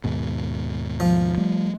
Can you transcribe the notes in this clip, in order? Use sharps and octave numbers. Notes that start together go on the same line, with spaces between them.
D#2 G#2 B2
F3
G3 A3